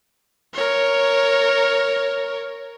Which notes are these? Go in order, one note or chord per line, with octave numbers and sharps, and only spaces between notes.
A#4 C#5